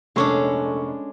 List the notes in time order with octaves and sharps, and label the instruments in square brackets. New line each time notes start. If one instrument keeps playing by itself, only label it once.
[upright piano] F1 A#2 C#6 [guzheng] G#3 C#4 D4 [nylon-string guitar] A4